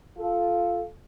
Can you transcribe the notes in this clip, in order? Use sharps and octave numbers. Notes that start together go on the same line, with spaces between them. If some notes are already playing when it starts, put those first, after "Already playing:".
F4 A4